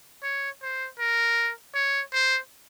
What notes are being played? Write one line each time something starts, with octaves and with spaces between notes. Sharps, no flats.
C#5
C5
A#4
C#5
C5